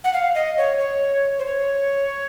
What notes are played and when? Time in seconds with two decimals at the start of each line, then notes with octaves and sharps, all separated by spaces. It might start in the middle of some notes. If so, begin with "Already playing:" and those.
0.04 F#5
0.13 F5
0.35 D#5
0.58 C#5
0.79 C#5
1.39 C5
1.45 C#5